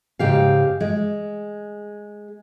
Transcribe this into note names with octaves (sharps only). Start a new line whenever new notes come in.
G#2 C#3 G4 F5
G#3